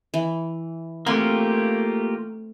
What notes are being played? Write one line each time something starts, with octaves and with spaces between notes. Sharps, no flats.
E3
A3 A#3 C4 F4 G4 F#5 G#5